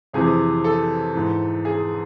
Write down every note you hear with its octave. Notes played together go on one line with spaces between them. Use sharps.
F2 C3 E3 G#4
A4
G#2 E3
G#4